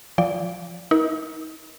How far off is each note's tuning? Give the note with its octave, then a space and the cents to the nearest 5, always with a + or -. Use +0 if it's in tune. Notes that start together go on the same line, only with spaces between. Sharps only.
F3 -10 D5 -15 G5 +0
D#4 +35 A#4 +25